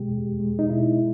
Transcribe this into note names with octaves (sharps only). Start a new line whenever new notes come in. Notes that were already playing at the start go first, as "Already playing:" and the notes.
Already playing: B2 G#3 G4
E2
G#3
D#4
B2 E4